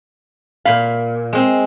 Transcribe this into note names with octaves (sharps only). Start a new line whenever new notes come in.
A#2 F5 B5
G#3 C4